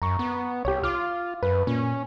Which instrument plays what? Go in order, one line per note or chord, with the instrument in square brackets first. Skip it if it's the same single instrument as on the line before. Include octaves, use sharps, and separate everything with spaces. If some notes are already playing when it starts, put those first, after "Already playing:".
[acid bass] F#2 [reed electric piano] A#5 C#6
[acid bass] B3
[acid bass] C2 [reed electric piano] G4 C#5
[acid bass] F4 [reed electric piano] D6 F6
[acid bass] F#2 [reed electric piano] B4
[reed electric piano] A#2 [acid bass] C#4